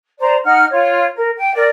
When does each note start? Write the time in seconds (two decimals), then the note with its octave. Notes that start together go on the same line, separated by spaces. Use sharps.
0.20 C5 D5 A#5
0.44 D#4 F#5 F6
0.71 F4 C#5
1.16 A#4
1.37 G5
1.54 A#4 D5